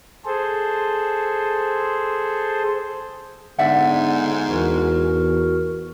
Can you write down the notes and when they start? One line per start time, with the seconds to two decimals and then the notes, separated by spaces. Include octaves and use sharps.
0.25 G#4 A4 C5
3.59 G#2 D3 B3 D5 E5 F#5
4.50 E2 F#4 A#4